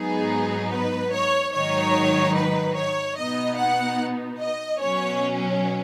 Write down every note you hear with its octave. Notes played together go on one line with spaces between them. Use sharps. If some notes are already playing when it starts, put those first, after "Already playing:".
Already playing: G#2 F#3 B3 D#4 G#4
B4
C#5
G#2 D#3 F#3 D#4 C#5
B4
C#5
B2 B3 D#4 D#5
F#5
D#5
B2 F#3 C#4 C#5